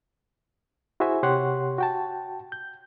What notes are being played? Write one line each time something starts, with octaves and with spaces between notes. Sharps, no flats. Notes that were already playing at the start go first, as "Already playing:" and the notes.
E4 F#4 G#4 C5 E5 G#5
C3 G4 C#5 F#5 C6 F#6
F#4 G5 A5
G6